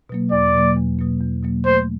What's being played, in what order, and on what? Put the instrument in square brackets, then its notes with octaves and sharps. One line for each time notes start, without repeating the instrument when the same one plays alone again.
[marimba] B2 F#3 A#3
[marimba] E2 [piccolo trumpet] D5
[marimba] B2 F#3 A#3
E2
B2 F#3 A#3
E2
B2 F#3 A#3
[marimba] A3 [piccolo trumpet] C5